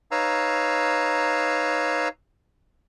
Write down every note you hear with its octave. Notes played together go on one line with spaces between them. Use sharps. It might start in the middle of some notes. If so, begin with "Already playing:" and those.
D#4 B4 C#5 F5 A#5 E6